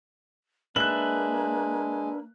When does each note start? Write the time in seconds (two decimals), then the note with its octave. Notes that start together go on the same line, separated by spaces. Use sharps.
0.76 G#3 A#3 D4 B4 E5 F#6 F#7